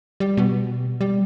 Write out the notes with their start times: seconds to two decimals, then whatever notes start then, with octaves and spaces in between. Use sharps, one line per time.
0.20 G3
0.37 B2
1.01 G3